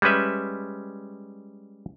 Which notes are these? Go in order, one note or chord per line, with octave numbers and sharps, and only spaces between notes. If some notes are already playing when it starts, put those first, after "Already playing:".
G3 G#3 C#4 B4 E5